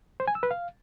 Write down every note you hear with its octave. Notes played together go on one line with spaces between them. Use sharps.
C5
G#5
E6
B4
F5